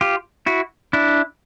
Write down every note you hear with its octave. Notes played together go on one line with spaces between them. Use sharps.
F4 G4
E4 F#4
D4 E4